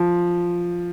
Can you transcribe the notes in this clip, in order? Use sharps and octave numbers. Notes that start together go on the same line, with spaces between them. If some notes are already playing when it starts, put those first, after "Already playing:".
Already playing: F3